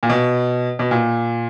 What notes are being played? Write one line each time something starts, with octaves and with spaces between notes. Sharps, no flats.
A#2
B2
B2
A#2